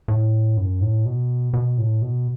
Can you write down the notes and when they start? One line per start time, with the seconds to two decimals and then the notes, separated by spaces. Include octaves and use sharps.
0.08 A2
0.58 F#2
0.81 A2
1.05 B2
1.53 B2
1.78 A2
2.02 B2